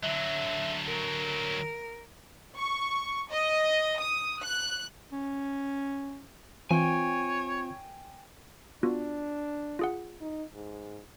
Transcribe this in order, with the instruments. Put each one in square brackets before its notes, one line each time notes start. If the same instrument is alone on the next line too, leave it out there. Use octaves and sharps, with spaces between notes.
[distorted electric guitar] D3 F#3 [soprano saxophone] E5
[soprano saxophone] A#4
[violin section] C#6
D#5
D#6
F#6
[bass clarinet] C#4
[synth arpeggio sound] E3 [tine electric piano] C4 F4 [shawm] C#5 [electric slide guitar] G5 G#5
[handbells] B3 F4 F#4 [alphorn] D4
[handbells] F4 G#4 F#5
[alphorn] D#4
G#2